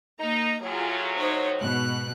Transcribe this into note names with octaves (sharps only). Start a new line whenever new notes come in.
A#3 D#4 A#5
A2 F#3 F4 G#4
D#4 C5 C#5
G#2 B2 F#6